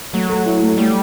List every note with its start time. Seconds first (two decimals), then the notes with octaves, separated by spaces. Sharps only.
0.13 F#3 A3
0.29 A4
0.46 E4
0.62 A3
0.78 G3 A3